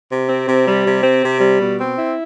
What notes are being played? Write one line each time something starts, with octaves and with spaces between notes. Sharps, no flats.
C3
C4
C3
G3
C3
C4
C3
G3
B2
C4
E4